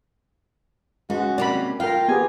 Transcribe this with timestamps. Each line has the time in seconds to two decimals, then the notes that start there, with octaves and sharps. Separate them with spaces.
1.10 G#3 C#4 F#4
1.38 C3 A#3 C#4 D5 B5
1.80 F4 A#4 F5 G5
2.09 B3 G4 G#4 G#5